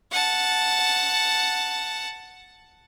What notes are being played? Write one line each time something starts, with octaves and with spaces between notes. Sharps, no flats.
F#5 A5